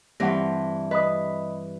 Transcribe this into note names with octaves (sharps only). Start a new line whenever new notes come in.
G2 E3 C4 F#5 A#6
B4 D#5 B5 D#6